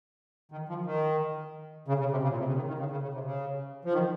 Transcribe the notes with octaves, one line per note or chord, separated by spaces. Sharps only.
D#3
F3
D#3
C#3
C#3
C3
C#3
A#2
C3
C#3
D#3
D#3
C#3
C#3
C#3
C3
C#3
F3
D#3